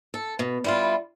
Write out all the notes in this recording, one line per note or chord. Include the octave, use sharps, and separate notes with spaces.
A4
B2
G3 E4 F4